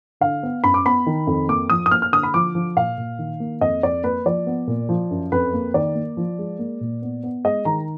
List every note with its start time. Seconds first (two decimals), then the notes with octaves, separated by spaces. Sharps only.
0.21 D3 F5
0.43 B3
0.64 F#2 B5
0.74 D6
0.85 B3 B5
1.07 D#3
1.27 F2
1.48 A#3 D6
1.70 F3 D#6
1.86 D#6
1.91 A#3 F6
2.02 F6
2.12 D3 D#6
2.23 B5
2.34 F3 D6
2.55 F3
2.76 A#2 F5
2.98 A#2
3.19 D#3
3.40 A#3
3.61 F2 D#5
3.83 F2 D5
4.04 A#3 B4
4.26 F3 D5
4.47 B3
4.67 A#2
4.89 F3
5.11 F#2
5.32 F2 B4
5.53 A#3
5.74 D#3 D5
5.95 A#3
6.17 F3
6.39 G#3
6.59 A#3
6.81 A#2
7.02 B3
7.23 B3
7.45 G#3 D#5
7.65 D#3 A#5